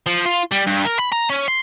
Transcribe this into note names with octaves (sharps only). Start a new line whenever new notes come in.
F3
F4
G3
G2
A#4
B5
A#5
C#4
C6